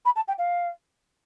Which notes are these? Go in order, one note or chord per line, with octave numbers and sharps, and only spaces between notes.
B5
A5
G5
F5